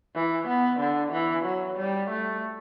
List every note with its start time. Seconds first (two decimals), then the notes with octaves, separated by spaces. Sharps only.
0.15 E3
0.48 B3
0.80 D3
1.12 E3
1.45 F#3
1.78 G3
2.10 A3